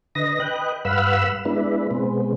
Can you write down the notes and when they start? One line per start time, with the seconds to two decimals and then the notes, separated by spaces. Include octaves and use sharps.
0.15 D3 B4 D#5 A#6
0.40 B4 D#5 G5 F#6
0.85 G2 B4 F5 F#5 B5 E6
1.45 G#3 B3 D4 E4 B4
1.91 B2 G#3 B3 C4